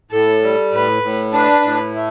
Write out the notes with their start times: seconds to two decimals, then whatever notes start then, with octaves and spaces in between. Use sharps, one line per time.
0.11 A2 A4
0.42 G3
0.72 A2 B4
1.03 A2
1.33 D4 B4
1.64 A2
1.94 A3